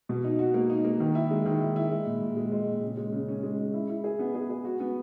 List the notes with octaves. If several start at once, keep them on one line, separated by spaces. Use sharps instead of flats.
B2
D#4
F#4
A#3
D#4
A#3
D#3
E4
G#3
D#3
E4
E4
G#3
A#2
A#2
G#3
G#3
A#2
C#3
G#3
C#3
C#4
G#3
G#3
E4
E4
G#4
B3
G#4
G#4
F#4
B3